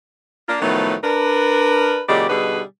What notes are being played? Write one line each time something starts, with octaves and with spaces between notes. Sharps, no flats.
A#3 D4 F4
A2 D#3 F3 F#3 A3 B3
D4 A#4 B4
A#2 C#3 F#3 G#3 G4 D5
B2 D3 G3 D#4 G#4 B4